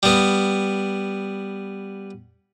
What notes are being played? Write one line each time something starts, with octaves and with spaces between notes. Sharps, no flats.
G3 B3